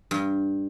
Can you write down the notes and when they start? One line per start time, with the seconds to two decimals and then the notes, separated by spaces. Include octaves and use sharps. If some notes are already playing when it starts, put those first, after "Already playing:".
0.11 G2